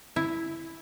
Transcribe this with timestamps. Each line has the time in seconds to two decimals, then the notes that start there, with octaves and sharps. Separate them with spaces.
0.16 E4